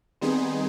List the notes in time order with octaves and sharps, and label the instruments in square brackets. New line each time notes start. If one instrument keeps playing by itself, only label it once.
[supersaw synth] D#3 G3 B3 D#4 G#4 [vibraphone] C4